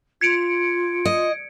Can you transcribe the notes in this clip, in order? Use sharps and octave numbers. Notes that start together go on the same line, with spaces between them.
F4 G#6 C#7 D7
D#5